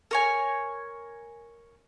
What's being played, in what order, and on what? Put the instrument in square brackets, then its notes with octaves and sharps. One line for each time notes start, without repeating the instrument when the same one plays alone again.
[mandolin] A#4 C#5 G#5